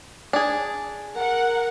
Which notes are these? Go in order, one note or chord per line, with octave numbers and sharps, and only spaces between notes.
D4 G#4
A#4 F#5